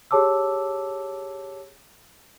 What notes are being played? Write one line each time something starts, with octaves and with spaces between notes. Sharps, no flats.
G4 G#4 C#5 A5 D6 E6